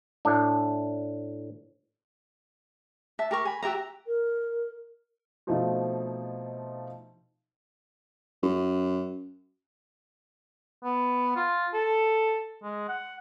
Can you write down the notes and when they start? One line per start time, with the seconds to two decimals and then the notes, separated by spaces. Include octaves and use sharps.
0.25 A2 D4
3.19 E5 A5
3.31 G4 A#4 C#6
3.45 G#5 B5
3.63 F#4 G4 E5 A#5
4.07 A#4
5.47 B2 F3 A3 C4 D#4 F4
8.43 F#2
10.84 B3
11.36 F4
11.74 A4
12.63 G#3
12.89 F#5